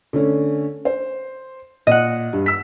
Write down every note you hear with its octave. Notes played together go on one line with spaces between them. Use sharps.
D3 A3 C#4
C5
A#2 D#5 F#5
G2
E6 B6